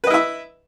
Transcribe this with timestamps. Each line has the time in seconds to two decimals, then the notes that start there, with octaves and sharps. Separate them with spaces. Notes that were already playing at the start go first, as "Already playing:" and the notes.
0.04 B4
0.07 D#5
0.10 E4
0.14 E5